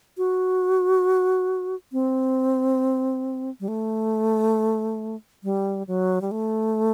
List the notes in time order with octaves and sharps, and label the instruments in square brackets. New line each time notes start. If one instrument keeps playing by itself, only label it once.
[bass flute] F#4
C4
G3
A3
G3
F#3
G3
A3